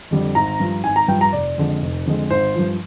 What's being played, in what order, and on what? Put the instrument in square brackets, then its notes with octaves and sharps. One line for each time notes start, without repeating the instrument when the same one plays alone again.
[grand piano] F2 D3 G3
G#1 A#5
G2 F3
G#1 G#5
A#5
G2 F3 G5
A#5
F1 D5
F2 D3 G#3
F1
F2 D3 G#3
G#1 C5
G2 F3